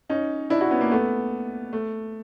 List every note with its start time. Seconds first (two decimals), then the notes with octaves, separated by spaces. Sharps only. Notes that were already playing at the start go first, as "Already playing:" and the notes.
0.10 C#4 D#4
0.50 D4 E4
0.61 E4 F#4
0.71 B3 C#4
0.81 A#3
0.91 A3 B3
1.73 A3